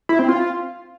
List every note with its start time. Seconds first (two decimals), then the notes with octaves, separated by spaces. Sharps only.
0.09 E4
0.19 C4
0.29 F4